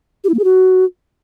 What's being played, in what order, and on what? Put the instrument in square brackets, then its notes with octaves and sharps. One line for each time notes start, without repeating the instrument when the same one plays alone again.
[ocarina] G4
E4
A#3
G#4
F#4